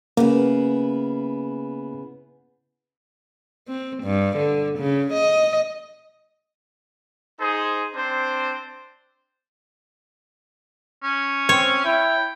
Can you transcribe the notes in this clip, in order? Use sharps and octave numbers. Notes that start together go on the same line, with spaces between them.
C#3 A#3 B3 E4
C4
G2
D3
C#3
D#5
D#4 G#4 C5
C4 D4 C5
C#4
C4 C#5
E4 G5